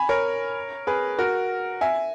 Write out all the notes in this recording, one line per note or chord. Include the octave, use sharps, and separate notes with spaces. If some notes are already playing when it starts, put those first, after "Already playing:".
Already playing: G#5 B5
A#4 C#5
G#4 B4
F#4 A#4
E5 G#5